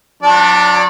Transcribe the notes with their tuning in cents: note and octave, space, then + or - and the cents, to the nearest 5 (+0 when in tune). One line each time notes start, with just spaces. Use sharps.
F#3 -35 D4 +0 D5 +0